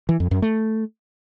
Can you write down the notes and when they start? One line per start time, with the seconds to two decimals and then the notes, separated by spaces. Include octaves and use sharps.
0.09 E3
0.20 F2
0.31 F#2
0.42 A3